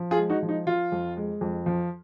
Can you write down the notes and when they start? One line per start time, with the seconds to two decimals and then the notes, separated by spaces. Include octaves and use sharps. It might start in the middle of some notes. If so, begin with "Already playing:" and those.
Already playing: F3
0.11 F4 G#4
0.18 G#3
0.30 D#4 F#4
0.42 F3
0.49 D#4
0.67 F3 F4
0.92 F2
1.17 G#3
1.41 F2
1.66 F3